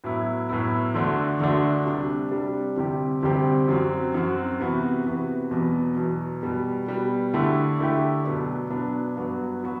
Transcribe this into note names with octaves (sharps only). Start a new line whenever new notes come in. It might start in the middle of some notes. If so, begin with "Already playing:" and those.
A2 F#3 B3 E4
A2 F#3 B3 E4
D2 D3 A3 D4 F#4
D2 D3 A3 D4 F#4
C3 G3 D4
C3 G3 D4
D2 C3 G3 C4 G4
D2 C3 G3 C4 G4
F#2 F#3 C4 F#4
F#2 F#3 C4 F#4
C3 E3 B3 F#4
C3 E3 B3 F#4
E2 B2 F#3 B3
E2 B2 F#3 B3
B2 G3 B3
B2 G3 B3
D3 A3 E4 G4
D3 A3 E4 G4
B2 F#3 B3 D4
B2 F#3 B3 D4
G2 F#3 B3 F#4
F#3 B3 F#4